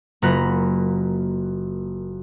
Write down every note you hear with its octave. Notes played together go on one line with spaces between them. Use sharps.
F#1 A#3 F4 A#5 B5 F#6